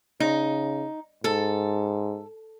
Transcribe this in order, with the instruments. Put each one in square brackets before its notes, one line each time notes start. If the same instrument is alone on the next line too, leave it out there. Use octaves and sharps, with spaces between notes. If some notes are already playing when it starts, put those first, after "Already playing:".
[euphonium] C#3 [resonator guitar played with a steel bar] D#4
[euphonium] G#2 [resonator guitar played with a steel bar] A4